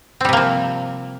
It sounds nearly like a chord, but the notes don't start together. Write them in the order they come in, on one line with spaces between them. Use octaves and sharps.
C4 G3 C3 A#3 F3